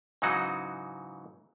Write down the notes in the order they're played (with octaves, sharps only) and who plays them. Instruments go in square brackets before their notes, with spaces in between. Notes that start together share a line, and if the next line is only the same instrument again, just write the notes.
[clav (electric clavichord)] G#2 C#3 E3 F#3 D#4 F#4